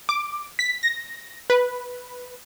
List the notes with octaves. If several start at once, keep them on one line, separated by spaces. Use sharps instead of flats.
D6
B6
A#6
B4